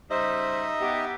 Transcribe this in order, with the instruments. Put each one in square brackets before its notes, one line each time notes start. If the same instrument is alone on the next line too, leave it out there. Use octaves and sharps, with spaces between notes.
[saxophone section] C#3 G3 C5 [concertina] D#4 D#5 E5
[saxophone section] B3 G4